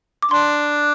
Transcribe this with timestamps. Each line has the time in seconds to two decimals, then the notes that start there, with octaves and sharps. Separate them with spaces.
0.22 D6
0.31 D4 C6